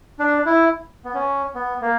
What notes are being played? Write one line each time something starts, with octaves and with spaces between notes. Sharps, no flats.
D4
E4
B3
C#4
B3
A#3